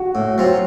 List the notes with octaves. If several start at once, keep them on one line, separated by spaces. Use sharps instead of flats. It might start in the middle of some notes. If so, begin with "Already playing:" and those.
Already playing: F#4
A2
F#3 C4 F4